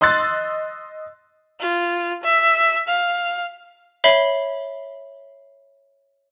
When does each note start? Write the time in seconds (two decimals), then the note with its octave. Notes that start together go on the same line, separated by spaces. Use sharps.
0.01 D#5 C6 E6 F#6 A6
1.60 F4
2.23 E5
2.88 F5
4.04 C#5 E5 B5 C7 G7